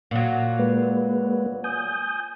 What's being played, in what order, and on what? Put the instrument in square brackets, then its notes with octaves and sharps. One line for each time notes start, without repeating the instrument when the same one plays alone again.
[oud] A#2 F#3
[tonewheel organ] G#3 A#3 B4
G#5 D#6 G6